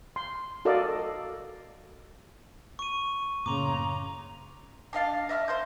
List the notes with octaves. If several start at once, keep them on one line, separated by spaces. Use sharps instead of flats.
C6
F#4 A4 A#4 D5 D#5 F5
C#6 D#7
F#2 A2 C#3 A#3 A#5 C6 D6
D4 D#5 F5 A5
D#5 E5 D6 F6
C5 C6 G6